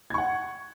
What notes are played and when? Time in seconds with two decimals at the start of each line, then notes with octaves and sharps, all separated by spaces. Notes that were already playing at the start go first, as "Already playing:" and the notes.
0.10 G#6
0.14 C#6
0.18 F#5